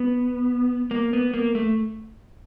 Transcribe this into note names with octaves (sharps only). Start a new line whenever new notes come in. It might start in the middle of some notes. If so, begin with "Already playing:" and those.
Already playing: B3
A#3
B3
A#3
A3